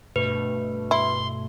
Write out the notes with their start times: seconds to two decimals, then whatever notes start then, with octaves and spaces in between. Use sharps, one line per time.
0.16 G2 B2 A3 B4
0.91 E4 C6